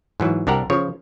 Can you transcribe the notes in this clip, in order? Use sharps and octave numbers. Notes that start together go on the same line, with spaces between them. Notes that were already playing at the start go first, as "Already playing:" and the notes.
G#2 E3 F#3
C2 D4 G4 A#4 F#5 A#5
C#3 F3 C#5